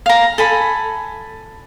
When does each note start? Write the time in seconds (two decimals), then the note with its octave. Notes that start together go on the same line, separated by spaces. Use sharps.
0.06 F5 A#5
0.38 A4 G#5 B5